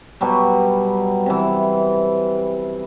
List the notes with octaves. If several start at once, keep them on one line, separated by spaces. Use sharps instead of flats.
B2 F#3 G3
C3 E3